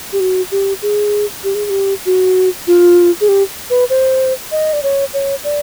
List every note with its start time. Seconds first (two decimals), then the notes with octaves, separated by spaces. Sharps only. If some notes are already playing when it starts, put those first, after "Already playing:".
0.13 G4
0.20 F#4
0.52 G4
0.82 G#4
1.44 G4
1.55 G#4
1.65 G#4
1.70 G4
2.06 F#4
2.67 F4
3.21 G#4
3.29 G4
3.70 B4
3.90 C5
4.52 D#5
4.73 D5
4.83 C#5
5.14 C#5
5.44 D5